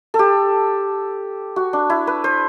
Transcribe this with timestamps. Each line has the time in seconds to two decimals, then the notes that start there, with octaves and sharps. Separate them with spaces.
0.14 A4
0.19 G4
1.56 F#4
1.73 D4
1.90 E4
2.07 B4
2.24 C5